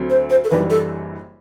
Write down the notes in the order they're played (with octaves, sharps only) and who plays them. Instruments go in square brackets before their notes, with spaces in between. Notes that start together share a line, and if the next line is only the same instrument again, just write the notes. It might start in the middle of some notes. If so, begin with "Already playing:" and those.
Already playing: [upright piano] D2 D3 F#3 C4
[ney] C5
C5
A4
[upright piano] F#1 F#2 E3 G3 D4 [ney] B4
[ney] A4